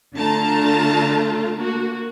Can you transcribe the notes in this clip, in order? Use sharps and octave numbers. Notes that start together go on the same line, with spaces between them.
D3 A3 F4 A5 A#5
A#3 F#4